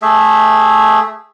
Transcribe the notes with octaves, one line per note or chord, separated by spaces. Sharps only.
A3 G#4 E5